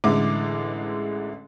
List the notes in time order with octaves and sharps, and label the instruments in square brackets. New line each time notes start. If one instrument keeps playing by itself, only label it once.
[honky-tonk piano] A1 D3 E3 G#3 E4 D6